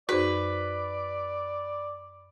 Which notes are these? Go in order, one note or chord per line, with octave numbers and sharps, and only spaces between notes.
F#2 D#4 F#4 G#4 B4 C5 D5